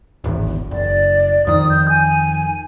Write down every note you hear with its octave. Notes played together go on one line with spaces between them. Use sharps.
D1 G#1 E2
F#1 D5
F2 D#3 D#6
G6
G#5